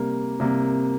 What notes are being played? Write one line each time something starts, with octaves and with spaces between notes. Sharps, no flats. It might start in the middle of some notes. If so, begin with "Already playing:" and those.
Already playing: C3 G3 A#3
C3 G3 A#3